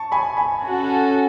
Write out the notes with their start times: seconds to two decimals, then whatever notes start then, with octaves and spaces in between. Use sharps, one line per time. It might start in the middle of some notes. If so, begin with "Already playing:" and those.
Already playing: A5 C#6
0.12 G#5 B5
0.37 G#5 B5
0.63 C#4 F#4 A4